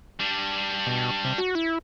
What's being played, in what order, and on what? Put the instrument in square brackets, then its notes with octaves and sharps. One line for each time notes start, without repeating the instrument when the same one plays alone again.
[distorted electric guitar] G3 D4
[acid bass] B2
C3
F#4
E4